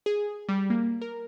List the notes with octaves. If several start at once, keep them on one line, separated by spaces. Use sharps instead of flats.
G#4
G3
A#3
A#4